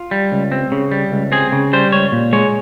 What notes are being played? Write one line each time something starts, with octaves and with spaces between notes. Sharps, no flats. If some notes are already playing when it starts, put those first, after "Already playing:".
Already playing: F4
G3
C#2
C4
C#3
G3
C#2
C4 G#4
C#3
G3 C5
C#2 C#5
A#2
G#3 C#5